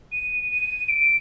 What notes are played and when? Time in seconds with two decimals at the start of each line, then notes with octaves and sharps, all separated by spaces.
0.12 D#7
0.50 D#7
0.89 D7